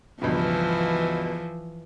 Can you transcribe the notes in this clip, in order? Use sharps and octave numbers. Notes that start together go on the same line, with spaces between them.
C#2 G2 B2 E3 F3